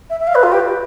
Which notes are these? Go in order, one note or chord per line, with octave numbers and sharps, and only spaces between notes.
E5
E5
F5
B4
F4
G4